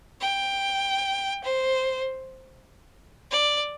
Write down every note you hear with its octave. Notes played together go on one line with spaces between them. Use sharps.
G5
C5
D5